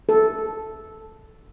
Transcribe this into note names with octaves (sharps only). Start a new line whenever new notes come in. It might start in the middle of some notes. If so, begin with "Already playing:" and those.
A4